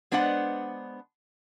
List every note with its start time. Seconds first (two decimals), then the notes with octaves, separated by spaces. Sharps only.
0.12 G#3 B3 D4 B4 C5 F#5